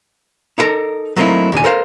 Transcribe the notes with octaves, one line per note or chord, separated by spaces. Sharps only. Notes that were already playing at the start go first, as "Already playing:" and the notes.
D#4 E4 A4 A#4 A#5
F#3 A3 A#3 C4 D#4 E4
D#2 A#2 D3 G#5
A4 A#4 C5 F5